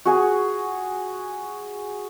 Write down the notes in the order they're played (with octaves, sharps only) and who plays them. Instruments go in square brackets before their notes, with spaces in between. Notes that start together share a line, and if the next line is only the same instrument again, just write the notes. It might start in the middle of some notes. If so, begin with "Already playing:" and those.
[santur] F#4 G#4 G#5